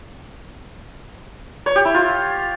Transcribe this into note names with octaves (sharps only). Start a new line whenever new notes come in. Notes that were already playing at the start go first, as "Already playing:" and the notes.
C#5
G4
E4
F4